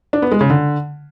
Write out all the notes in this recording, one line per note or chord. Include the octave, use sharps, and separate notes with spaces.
D4
B3
G#3
C#3
D3